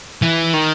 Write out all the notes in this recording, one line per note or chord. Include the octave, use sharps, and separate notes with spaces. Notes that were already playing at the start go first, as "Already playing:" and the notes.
E3
D#3